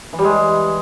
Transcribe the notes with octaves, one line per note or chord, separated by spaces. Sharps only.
E3
G3
G#3